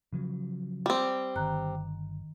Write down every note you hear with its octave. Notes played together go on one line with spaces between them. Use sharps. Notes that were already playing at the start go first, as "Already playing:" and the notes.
C#3 F3 F#3
G3 C4
G1 D#3 A#5 F#6